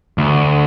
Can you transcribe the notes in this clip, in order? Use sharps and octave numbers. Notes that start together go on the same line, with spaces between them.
D2